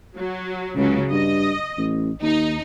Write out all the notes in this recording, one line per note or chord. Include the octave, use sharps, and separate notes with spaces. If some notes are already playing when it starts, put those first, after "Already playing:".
F#3
C#2 C#3 F#3
G2 D#5
A1
D#2 D#4